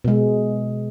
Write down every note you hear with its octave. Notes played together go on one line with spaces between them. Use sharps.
B2 G#3